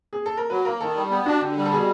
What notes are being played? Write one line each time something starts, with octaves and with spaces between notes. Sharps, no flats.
G#4
A4
A#4
F#3 B4
A#3 A#4
D#3 A4
G3
B3 G4
D4 F#4
D3 G4
G3
A4
B2 G#4